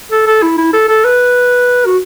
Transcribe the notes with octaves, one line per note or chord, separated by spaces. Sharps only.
A4
A4
E4
E4
A4
A4
B4
F#4